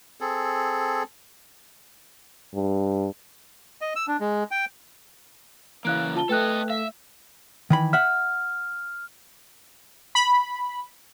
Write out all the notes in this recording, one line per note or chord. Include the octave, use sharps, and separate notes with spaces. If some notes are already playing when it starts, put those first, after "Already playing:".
C4 G#4 A4
G2
D#5
E6
D4
G#3
G5
C#3 E3 A#3 F5 F#6 D7
F4 A5 G7
A3 A4 B4 D#5 G5 F#6
E5 F5
D#3 E3 B5
E5 F#5 F6
B5